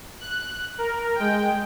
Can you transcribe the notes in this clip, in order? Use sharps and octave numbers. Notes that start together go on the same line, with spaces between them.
F#6
A#4
G#3 G5